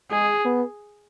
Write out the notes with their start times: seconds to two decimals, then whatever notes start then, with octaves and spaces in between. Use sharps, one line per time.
0.11 G#3 G#4
0.45 B3